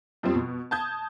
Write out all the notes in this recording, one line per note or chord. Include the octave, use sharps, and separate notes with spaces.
F2 F3 G3 C4
B2
A5 D#6 G6 G#6